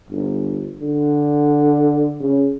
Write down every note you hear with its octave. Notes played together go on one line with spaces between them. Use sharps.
G1
D3
C#3